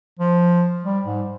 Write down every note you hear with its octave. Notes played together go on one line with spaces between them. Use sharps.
F3
G3
G#2